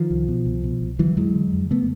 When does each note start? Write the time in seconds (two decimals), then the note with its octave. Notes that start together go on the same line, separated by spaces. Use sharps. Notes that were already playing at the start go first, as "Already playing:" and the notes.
Already playing: D#3 F3
0.10 C2
0.28 B2
0.45 C2
0.64 B2
0.81 C2
0.99 D3 E3 F#3
1.17 F2 F#3 G#3
1.35 D3
1.53 F2
1.71 C#3 A3 B3